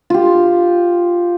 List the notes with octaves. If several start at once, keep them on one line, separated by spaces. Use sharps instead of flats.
F4 G4